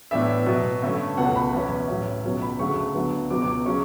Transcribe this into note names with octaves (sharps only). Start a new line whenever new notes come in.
A2 E3 B3 D4 E5
B2 F#3 B3
G2 D3 A3 C#4
C#2 B2 A3 F#5
B5
E2 B2 F#3 C#4
A2 F#3 C#4
C#2 B2 F#3 C#4
B5
D2 C#3 F#3 A3 C#6
D2 D3 F#3 B3
C#2 B2 F#3 B3 D6
D6
C#3 F#3 C#4 C#6